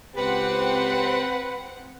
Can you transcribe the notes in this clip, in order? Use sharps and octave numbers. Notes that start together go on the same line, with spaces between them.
C#2 C4 G4 B4 F#5